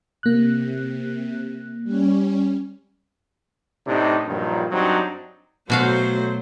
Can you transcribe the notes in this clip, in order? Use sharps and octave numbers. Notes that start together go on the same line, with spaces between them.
C3 A#3 F#6
G3 C#4
A2 C3 D4 D#4
G2 A#2 D#3 F3 F#3
G2 F#3 C4 D4 D#4
B2 F#3 A3 F#4 C5 F5